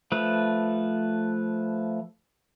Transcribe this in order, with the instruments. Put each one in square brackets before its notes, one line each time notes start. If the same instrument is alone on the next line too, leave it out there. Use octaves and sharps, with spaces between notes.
[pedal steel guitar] F3 A3 B4